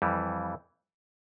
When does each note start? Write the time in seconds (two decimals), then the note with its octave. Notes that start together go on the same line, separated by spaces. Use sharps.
0.02 F2 E3 G3